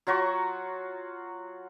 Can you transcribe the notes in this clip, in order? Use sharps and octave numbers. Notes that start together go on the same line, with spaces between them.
F#3 F4 F#4 C#6